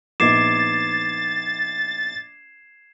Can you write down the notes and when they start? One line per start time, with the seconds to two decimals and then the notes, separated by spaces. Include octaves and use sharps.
0.20 A#1 B3 D#4 D6 G#6 A6 C7 E7